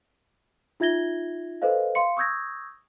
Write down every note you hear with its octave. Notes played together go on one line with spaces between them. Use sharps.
D#4 F4 E5 G#6 A#6 G7
A4 B4 C5 D#5 F5
F5 C6 C#7
C#6 D#6 E6 G6 G#6 A#6